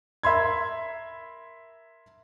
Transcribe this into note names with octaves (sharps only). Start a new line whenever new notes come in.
A#4 E5 B5 C6 G#6